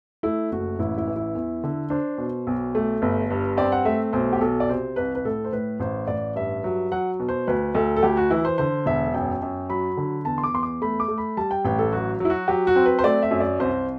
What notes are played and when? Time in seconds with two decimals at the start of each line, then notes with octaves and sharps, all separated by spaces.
0.23 A3 E4
0.52 F#1 F#4
0.79 A1 E4
0.98 E4
1.08 E3
1.16 E4
1.35 E2
1.63 D3
1.90 D4 C5
2.18 B2
2.47 B1
2.75 A3
3.02 G1
3.30 G2
3.57 C4 D5
3.72 F#5
3.85 A3 E5
4.13 B1 C5
4.33 G4
4.41 B1 A4
4.60 D5
4.69 C3 C5
4.96 C2 B4
5.15 B4
5.25 A2 A4
5.44 C5
5.53 A2 B4
5.80 A1 C5
6.08 A1 D5
6.36 G2 E5
6.64 F#3
6.92 F#3 F#5
7.20 B2
7.29 C5
7.47 D2 B4
7.75 D2 A4
7.96 A4
8.03 D2 G4
8.17 F#4
8.31 E3 E4
8.45 C5
8.58 D3 C5
8.86 E1 E5
9.14 F#2 G5
9.42 F#2
9.70 F#3 B5
9.97 D3
10.25 E2 A5
10.38 C6
10.44 D6
10.54 E2 C6
10.63 D6
10.82 A3 B5
11.00 D6
11.08 A3
11.18 B5
11.37 G3 A5
11.51 G5
11.65 A1 G5
11.79 A4
11.92 F#3 F#4
12.20 F#3 E4
12.30 F#4
12.48 F#3 G4
12.67 F#4
12.76 C4
12.86 B4
12.99 C5
13.04 A3 D5
13.22 E5
13.31 F#2
13.40 D5
13.60 C2 C5